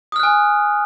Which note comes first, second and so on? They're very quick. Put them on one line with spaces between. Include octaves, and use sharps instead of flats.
D#6 F6 F#6 G#5